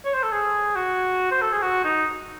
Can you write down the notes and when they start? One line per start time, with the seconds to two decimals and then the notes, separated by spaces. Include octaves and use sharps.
0.05 C#5
0.14 C5
0.23 A4
0.32 G#4
0.75 F#4
1.31 C5
1.42 A4
1.52 G#4
1.62 F#4
1.84 D#4